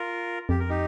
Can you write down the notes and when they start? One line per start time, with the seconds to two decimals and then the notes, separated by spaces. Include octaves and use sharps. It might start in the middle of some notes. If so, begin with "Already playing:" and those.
Already playing: F4 A#4
0.49 F2 G4
0.60 A#4
0.70 D#4 G4